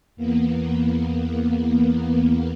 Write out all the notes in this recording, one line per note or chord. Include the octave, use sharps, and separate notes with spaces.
E2 A#3 B3